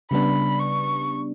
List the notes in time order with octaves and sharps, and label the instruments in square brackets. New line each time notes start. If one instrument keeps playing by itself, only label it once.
[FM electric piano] C#3 G3 B3 D4 [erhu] B5
[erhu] C#6